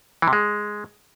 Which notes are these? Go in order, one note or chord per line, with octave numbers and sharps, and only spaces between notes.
E3
C3
G#3